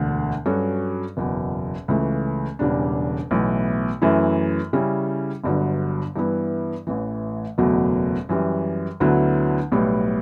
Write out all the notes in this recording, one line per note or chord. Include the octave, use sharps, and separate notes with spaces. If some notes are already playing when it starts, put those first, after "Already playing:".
Already playing: E1 D2 D3
G2 F#3 C#4 F#4 A4
F#1 E2 B2
C#2 C#3 E3 A3
E1 E2 C#3 G3 D4
B1 A2 E3 B3
F#2 E3 A3 E4
C#3 G3 C#4 E4
G1 G2 D3 F#3
G2 E3 B3 E4
A1 A2 E3
F#1 E2 B2 F#3 A3
F#2 E3 G3
D2 D3 F#3 B3 E4
B1 A2 G3 B3